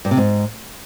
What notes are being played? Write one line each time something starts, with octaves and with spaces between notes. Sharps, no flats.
G2
C3
G#2